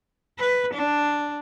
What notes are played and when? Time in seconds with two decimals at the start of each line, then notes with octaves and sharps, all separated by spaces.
0.39 B4
0.74 D4